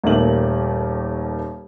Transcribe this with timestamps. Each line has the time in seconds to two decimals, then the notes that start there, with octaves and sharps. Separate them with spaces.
0.04 D#1 D#2 A3 A#3 F#7